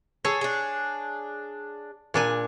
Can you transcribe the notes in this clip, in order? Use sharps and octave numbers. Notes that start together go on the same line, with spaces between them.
G#4 A4 C#5
D4 G#4
A#2 D4 G#5